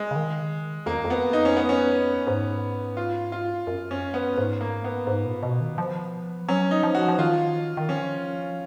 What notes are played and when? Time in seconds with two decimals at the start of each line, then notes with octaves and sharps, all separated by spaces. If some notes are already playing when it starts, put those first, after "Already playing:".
Already playing: G#3
0.11 C#3
0.16 D#3
0.86 F2 A#3
1.04 F2
1.10 B3
1.33 D#4
1.45 C#4
1.57 B3
1.69 C#4
2.27 G#2
2.97 F4
3.32 F4
3.67 F#2
3.91 C#4
4.14 B3
4.38 G#2
4.61 A#3
4.84 B3
5.07 G#2
5.26 A#2
5.43 B2
5.60 D#3
5.78 F3
6.49 F#3 C#4
6.71 D#4
6.83 F3
6.95 F#4
7.08 F3
7.18 D#3 F4
7.77 D#3
7.89 F3 C#4